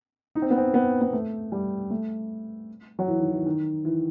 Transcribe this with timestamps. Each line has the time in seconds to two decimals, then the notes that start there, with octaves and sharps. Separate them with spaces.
0.35 D#4
0.42 C4
0.50 B3
0.58 C4
0.74 B3
1.01 B3
1.13 A3
1.52 G3
1.90 A3
2.99 F#3
3.08 E3
3.20 D#3
3.32 E3
3.46 D#3
3.85 E3